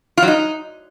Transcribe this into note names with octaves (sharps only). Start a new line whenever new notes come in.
F4
F#3
D#4